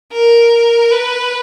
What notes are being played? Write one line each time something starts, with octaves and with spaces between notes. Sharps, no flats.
A#4
B4